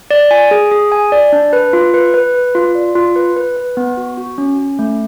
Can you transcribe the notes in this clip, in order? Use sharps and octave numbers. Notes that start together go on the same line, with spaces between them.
D5
G#5
G#4
G#4
G#5
D5
D4
B4
F4
B4
B4
B4
F4
D5
F4
B4
B4
B4
B3
F#4
F#4
C#4
C#4
A3